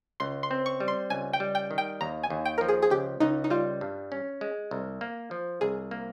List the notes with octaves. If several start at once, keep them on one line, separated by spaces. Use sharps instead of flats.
C#2 C6
C6
C4
C#6
G3
C6
C#2 G#5
G5
G3
G5
D#3
G5
D#2 A#5
G#5
D#2
G5
F3 A#4
G#4
G#4
C#2 G4
C#2 D#4
D#4
G3 F4
G2
C#4
G#3
C2
A#3
F3
C2 G#4
A#3